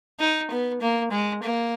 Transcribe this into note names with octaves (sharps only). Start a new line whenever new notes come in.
D#4
B3
A#3
G#3
A#3